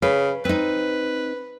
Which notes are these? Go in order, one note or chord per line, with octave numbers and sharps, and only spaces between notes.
C#3 B4
C4 D#4 B4